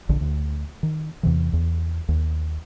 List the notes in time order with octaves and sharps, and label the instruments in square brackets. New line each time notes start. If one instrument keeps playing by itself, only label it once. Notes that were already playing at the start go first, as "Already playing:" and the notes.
[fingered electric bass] A#1 D3
D2
D#3
E2 C3 E3
E2
D#2